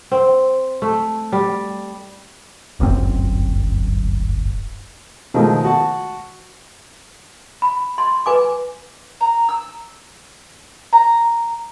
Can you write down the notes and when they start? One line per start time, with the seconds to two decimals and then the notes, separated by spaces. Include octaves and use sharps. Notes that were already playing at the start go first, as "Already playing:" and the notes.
0.11 C4
0.82 A3
1.32 G3
2.80 D1 G1 F#2 C4
5.34 B2 D#3 F3 G#3 A3
5.65 F#4 A5
7.62 B5
7.98 C6
8.26 B4 G#5 D6
9.21 A#5
9.49 E6
10.93 A#5